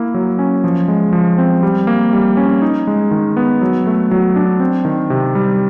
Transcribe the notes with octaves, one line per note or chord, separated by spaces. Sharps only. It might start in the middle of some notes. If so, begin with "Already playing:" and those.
Already playing: A#3 E4
F#3
C#4
F3
G#3
F3
C4
G3
A#3
G3
C#4
D#4
G#3
D#3
B3
F#3
A3
F#3
D4
C4
D#3
C3
G3